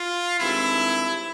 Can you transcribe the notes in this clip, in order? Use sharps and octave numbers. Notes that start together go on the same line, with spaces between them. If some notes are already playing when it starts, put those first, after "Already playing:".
Already playing: F4
G2 D#3 G#3 C4 E4